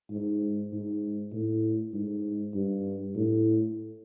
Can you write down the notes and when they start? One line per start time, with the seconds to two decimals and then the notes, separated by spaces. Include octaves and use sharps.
0.10 G#2
0.72 G#2
1.33 A2
1.93 G#2
2.55 G2
3.15 A2